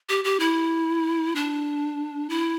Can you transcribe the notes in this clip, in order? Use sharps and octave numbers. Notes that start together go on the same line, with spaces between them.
G4
G4
E4
D4
E4